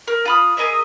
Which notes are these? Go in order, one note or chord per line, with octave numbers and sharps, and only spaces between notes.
A#4
F4 B5 D#6
G#4 A#4 D#5 E5